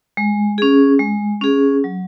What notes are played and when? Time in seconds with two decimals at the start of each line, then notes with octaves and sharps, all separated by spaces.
0.17 G#3
0.58 C#4 G#4
0.99 G#3
1.41 C#4 G#4
1.84 F#3